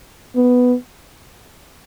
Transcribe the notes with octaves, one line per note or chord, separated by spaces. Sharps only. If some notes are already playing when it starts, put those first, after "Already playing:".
B3